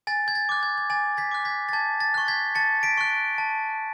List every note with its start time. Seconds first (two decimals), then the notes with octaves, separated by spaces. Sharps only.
0.07 G#5 A6
0.28 G#6
0.35 A6
0.49 D6 F#6
0.63 G#6
0.78 G#6
0.90 G#5 A6
1.17 G#6 B6
1.31 D6 F#6
1.45 G#6 B6
1.69 A6
1.73 A5 G#6
2.00 A6
2.14 C#6 F#6
2.28 G#6 B6
2.55 A5 A6 C#7
2.83 B6 D7
2.97 C#6 F#6
3.38 A5